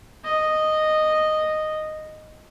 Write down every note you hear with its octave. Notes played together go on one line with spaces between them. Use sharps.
D#5